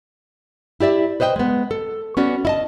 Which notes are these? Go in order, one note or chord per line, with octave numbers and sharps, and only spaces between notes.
E4 G4 D5 E5
B4 C5 D#5 F5 G5
G#3 B3
A4
B3 C#4 F#4 D5
E4 D#5 A5